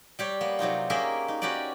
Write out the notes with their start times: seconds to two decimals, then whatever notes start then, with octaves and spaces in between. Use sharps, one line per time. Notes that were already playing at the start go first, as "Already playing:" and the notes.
0.19 G3 G4 C#5
0.41 A#3 B3
0.59 C3 F#3 D#4 F4
0.90 A#3 C#4 G4 G#4 A#4 E5
1.28 D#4
1.42 C#4 F#4 G4 B4 D5